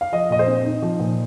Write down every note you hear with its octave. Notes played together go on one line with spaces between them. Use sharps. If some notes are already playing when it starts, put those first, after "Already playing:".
F5
F3 D#5
A#2 D#5
C5
C4
D#4
F3
A#2